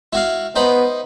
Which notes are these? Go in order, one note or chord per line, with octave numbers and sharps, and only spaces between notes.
E4 F#4 F5
B3 D#4 C5 B5